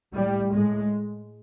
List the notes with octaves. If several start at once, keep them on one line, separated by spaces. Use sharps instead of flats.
A2 G3
A2 G#3